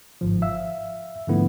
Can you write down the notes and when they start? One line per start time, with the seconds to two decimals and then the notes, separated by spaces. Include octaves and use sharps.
0.21 G1 G#2 F3
0.42 E5 F5 E6
1.28 G#2 D3 F3 A3 B3 E4